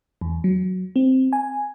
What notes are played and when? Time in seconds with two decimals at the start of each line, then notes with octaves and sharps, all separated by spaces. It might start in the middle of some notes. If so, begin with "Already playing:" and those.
0.21 E2
0.44 F#3
0.96 C4
1.33 G#5